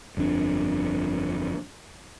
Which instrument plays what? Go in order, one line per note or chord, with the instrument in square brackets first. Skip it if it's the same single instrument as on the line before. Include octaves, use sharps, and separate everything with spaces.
[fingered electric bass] G1 F2 A#2 D4